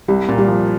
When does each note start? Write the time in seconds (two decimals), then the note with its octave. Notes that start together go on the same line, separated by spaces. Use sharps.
0.08 C2 G3
0.29 A#2
0.38 G3
0.48 F3